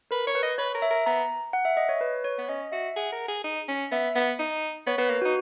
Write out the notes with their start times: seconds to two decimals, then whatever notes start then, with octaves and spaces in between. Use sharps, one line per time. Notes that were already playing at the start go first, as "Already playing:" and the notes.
0.11 A#4 B4
0.27 C#5
0.35 B4
0.43 D#5
0.58 B4 C#5
0.74 A#4
0.82 E5
0.90 A#4
1.06 B3 A#5
1.53 F#5
1.65 E5
1.77 D#5
1.89 C#5
2.01 B4
2.24 C#5
2.38 B3
2.49 C#4 D#5
2.72 F#4 E5
2.96 G#4 F#5
3.12 A#4
3.28 G#4
3.44 D#4
3.68 C#4
3.92 B3 E5
4.15 B3
4.39 D#4
4.87 B3 C#5
4.98 B3 B4
5.10 A#3
5.22 F#4
5.25 D#4